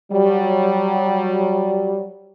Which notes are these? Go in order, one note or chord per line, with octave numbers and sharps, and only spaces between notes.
F#3 G3